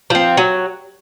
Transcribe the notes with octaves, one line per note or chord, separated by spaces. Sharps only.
F3 C4
F#3